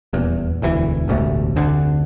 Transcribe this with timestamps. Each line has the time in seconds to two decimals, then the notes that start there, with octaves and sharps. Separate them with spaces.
0.13 D#1 E2
0.62 E1 D2 G#2 E3
1.08 E1 A1 D2 A3
1.56 F1 D2 D3